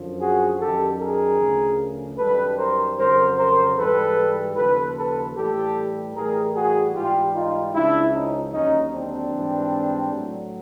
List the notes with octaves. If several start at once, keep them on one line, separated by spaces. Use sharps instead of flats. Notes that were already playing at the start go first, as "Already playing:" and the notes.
Already playing: F#2 D3 F3
F#4 G#4
F#2 D#3 G3 G4 A4
G#4 A#4
D2 C#3 F3
F#2 D#3 G3 A4 B4
A#4 C5
F2 C#3 F#3 A#4 C5
A#4 C5
G#2 E3 G3 A4 B4
D#2 C#3 F3 A4 B4
A4 B4
A2 E3 G3 G4 A4
A2 E3 G3 G#4 A#4
F#4 G#4
G#2 E3 G3 F4 G4
D#4 F4
C#2 C#3 F3 D4 E4
C#4 D#4
D#2 D3 F#3 C#4 D#4
C4 D4
G#2 E3 G3
A2 F#3